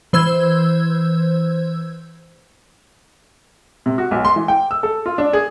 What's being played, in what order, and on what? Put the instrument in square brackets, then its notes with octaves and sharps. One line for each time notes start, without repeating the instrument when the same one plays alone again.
[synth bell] E3 C5 E6 G#6
[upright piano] C3
F#4
B1
C6
E3
G5
E6
A4
F4
D4
G#4